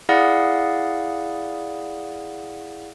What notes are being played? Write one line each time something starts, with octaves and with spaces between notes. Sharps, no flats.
E4 G#4 D5 F5 F#5 D#6